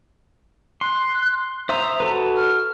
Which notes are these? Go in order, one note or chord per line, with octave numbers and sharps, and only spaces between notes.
C6 F#6
C5 E5 A#5 D#6
F#4 A4 B4
F6